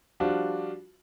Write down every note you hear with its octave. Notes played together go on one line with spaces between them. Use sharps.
F3 G3 D4 F4 F#4